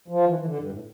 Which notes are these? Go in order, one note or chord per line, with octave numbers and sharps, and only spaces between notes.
F3
E3
E3
D3
G2
A2